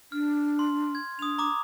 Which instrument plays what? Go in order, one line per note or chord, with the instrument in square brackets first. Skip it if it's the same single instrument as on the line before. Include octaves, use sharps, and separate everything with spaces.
[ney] D4 [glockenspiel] F6
[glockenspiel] C6
G#6
[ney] D4 [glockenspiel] D#6 F7
[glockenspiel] A#5 D6 D#6